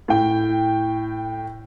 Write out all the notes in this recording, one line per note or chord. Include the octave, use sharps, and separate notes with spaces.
A2 G5